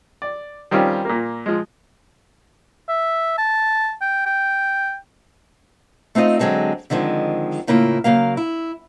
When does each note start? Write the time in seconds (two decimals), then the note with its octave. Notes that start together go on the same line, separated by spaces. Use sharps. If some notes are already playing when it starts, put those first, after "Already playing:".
0.22 D5
0.71 D#3 G3 C4 C#4 F4
1.05 A#2 A#3
1.46 F3 G#3
2.88 E5
3.38 A5
4.01 G5
4.26 G5
6.15 A3 C4 D#4 F4 D#5
6.39 D3 F#3 G#3 C4 A4
6.90 D3 D#3 F3 G#3 C4
7.67 A2 C#3 A#3 E4 F4
8.04 C#3 F#3 A#3 F5
8.37 E4